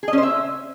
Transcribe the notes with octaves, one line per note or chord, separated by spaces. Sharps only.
G#4
D#5
C#4
C5
E5